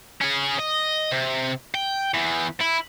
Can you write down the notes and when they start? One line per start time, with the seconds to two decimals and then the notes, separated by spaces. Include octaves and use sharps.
0.21 C#4 G#4
0.60 D#5
1.12 C3
1.74 G5
2.14 E2 E3
2.61 E4